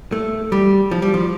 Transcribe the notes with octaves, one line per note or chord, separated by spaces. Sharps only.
A3
G3
F3
G3
F3